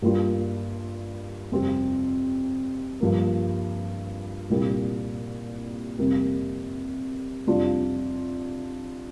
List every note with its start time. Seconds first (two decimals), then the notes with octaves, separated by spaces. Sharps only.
0.02 G2 G3 A#3 D4 F4
1.52 F2 C3 G3 C4 G4
3.00 G2 F3 A#3
4.50 C2 A#2 G3 A#3
5.98 F2 C3 G3 A#3
7.47 F2 C3 G3 D4 F4